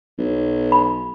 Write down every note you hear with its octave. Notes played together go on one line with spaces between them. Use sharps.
B1
B5